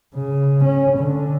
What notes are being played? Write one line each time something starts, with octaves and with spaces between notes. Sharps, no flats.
C#3
C#4
D3